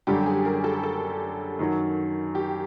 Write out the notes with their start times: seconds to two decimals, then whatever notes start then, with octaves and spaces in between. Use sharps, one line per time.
0.07 F#2 D3 G3 G4
0.26 G#4
0.45 A#4
0.64 A4
0.83 A4
1.59 F#2 D#3 F#3
2.35 G4